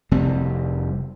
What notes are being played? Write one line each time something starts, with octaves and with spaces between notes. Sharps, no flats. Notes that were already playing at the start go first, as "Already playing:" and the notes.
F1 C3 G3 C4